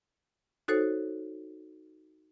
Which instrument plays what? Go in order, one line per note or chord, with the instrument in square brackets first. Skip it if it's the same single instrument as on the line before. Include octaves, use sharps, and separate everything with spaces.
[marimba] D#4 F#4 A4 C5 C#5